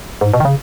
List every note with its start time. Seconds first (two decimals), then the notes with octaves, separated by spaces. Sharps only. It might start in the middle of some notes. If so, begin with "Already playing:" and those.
0.21 G#2
0.34 B2
0.40 D#3
0.45 C#3